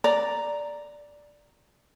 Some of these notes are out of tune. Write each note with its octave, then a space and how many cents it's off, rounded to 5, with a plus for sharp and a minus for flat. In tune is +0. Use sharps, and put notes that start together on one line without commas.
D5 +0 A#5 +0